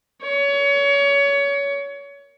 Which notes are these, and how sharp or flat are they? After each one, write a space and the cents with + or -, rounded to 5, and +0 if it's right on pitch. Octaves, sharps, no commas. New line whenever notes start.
C#5 +25